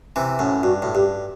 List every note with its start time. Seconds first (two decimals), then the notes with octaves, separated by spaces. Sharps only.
0.16 C3 E3
0.39 F#2 A2
0.63 G2 F#4
0.82 A2
0.94 G2 G4